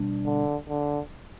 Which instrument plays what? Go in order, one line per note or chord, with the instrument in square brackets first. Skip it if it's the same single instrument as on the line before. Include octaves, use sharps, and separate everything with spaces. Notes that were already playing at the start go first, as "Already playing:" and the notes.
Already playing: [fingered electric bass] B2 G3 D4
[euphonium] D3
D3